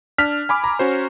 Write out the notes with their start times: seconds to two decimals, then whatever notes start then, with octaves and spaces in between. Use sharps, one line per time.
0.18 D4 F6 B6
0.49 G#5 B5 D6
0.64 A#5
0.79 C#4 F#4 C5